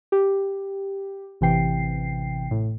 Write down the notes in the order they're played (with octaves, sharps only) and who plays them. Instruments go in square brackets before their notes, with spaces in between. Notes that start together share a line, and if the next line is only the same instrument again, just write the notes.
[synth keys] G4
A1 C3 E3 G5 C7
A2